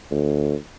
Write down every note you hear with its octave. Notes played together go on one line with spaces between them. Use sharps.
D2